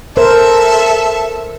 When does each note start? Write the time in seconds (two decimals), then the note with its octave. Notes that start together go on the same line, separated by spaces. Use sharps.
0.17 A4 A#4 C5 E5